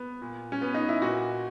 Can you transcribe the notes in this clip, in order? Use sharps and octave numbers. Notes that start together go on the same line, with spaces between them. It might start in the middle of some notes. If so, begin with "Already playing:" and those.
Already playing: B3
A#2
C#4
B3
D#4
E4
A#2 F#4